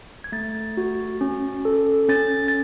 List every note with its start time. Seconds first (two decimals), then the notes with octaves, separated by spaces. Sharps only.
0.24 G#6
0.32 A3 A6
0.77 F#4
1.21 C#4
1.65 A4
2.09 C#4 A6
2.48 A6